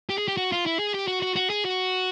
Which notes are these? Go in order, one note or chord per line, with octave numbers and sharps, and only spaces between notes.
G4
G#4
G4
F#4
F4
E4
G#4
G4
F#4
F#4
F#4
G#4
F#4